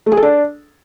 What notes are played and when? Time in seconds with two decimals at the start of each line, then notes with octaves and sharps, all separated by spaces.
0.06 A3
0.12 G#4
0.17 A4
0.23 D4